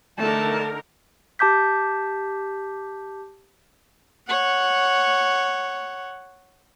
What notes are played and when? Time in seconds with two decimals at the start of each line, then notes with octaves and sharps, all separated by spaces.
0.18 D3 A3 D#4 A#4 A5
1.39 G4 A5 D6 G6 B6
4.28 C#5 F#5